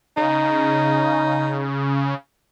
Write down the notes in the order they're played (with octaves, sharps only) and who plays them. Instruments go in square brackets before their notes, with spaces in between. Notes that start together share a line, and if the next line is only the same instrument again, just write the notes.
[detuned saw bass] C#3 [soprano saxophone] D#4